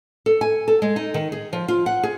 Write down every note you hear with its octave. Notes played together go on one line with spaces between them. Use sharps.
A4
G#5
A4
G#3
D#4
D#3
G#4
F3
F4
F#5
G#4